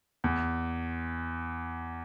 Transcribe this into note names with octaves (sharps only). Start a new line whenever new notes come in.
E2